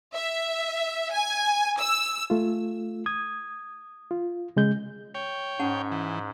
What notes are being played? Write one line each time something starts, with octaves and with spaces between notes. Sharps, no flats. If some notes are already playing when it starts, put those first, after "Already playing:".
E5
G#5
E6
A3 F4
D#6 G#6
F4
C#3 G#3 G6
C#5 G5
G#2 C#4 F#5 A5
E3